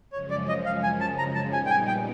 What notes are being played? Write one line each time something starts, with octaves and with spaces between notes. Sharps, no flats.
F#2 C#3 F3 G#3 C#4 C#5
D5
D#5
F5
G#5
A5
A#5
A5
A#2 G3 B3 D#4 G#5
G5
G#5
G5